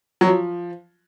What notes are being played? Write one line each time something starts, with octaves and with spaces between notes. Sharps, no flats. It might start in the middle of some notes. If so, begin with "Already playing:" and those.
F#3
F3